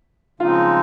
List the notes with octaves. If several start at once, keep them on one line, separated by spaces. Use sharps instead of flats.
C#3 F3 G#3 C4 D#4 F4